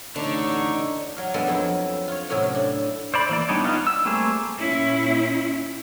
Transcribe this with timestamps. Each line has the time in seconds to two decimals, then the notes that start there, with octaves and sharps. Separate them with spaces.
0.16 A1 D3 A3 D4 D#4 C#5
1.16 F#3 F5
1.34 G3 G#3 B3 D4 F4 A4
1.47 F2 F#3 E4
2.08 F4 C#5
2.29 A2 C3 F#3 C#4 E4
2.55 D4
3.14 C5 D5 B5
3.29 E3 A#3 D5
3.49 G3 B3 D4 D#4 C#5
3.64 B3 D#4 F4
3.87 E6
4.05 G3 A3 A#3 C4 G#4
4.59 A#2 C#4 E4